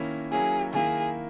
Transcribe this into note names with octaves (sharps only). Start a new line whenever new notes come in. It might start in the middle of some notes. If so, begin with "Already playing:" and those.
Already playing: D#3 A#3 C#4 E4
F#3 A#3 C#4 E4 G#4
D#3 A#3 E4 G#4